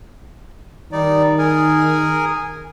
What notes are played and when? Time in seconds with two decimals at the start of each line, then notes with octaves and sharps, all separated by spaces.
0.92 D#3 G3 D#4 D5
1.38 G#4 A#4 G#5